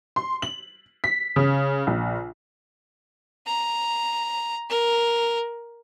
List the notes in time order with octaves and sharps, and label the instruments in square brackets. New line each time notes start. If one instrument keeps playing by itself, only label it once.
[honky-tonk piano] C6
F#7
B6
C#3
A#1
[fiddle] A#5
A#4